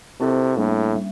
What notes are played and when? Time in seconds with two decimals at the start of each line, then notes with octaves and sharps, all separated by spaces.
0.20 C3 C4 E4 A4 C5
0.58 A2 G3 A#3 D4
0.96 G3